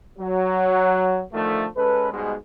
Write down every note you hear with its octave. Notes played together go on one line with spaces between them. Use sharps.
F#3
D3 D#3 F3 A3
G#3 C#4 A4 B4
G#2 B2 G3 G#3